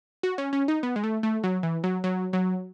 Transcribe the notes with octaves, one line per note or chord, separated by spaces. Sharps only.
F#4
C#4
C#4
D#4
B3
G#3
A3
A3
F#3
E3
F#3
F#3
F#3